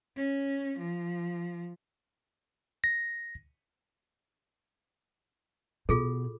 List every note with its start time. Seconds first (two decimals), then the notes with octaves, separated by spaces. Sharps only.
0.16 C#4
0.78 F3
2.84 A#6
5.89 B2 F4 G#4 A4